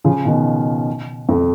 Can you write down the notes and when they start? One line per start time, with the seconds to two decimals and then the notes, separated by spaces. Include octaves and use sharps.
0.04 C#3 F3
0.25 B2 D#3
1.29 F2